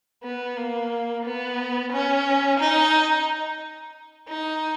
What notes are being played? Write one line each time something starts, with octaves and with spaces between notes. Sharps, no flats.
B3
A#3
B3
C#4
D#4
D#4